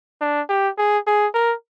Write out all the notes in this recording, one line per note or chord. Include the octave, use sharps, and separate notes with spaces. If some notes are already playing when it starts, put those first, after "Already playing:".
D4
G4
G#4
G#4
A#4